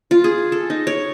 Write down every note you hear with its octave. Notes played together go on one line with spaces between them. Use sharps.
F4
G#4
A4
D#4
C#5